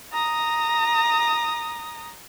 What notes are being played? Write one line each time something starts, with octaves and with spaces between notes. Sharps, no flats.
A#5 D#6